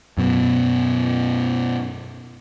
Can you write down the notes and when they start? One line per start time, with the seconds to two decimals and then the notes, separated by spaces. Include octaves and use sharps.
0.18 F#2 B2